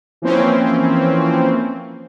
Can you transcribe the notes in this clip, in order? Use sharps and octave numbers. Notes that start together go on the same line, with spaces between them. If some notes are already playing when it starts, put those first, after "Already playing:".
E3 F3 A#3 C4 C#4